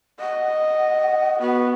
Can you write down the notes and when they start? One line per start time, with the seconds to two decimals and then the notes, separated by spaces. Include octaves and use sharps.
0.20 D#5 F#5
1.40 B3 F#4